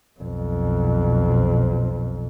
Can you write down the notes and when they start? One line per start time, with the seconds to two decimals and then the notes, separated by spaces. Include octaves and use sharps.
0.21 B1 F2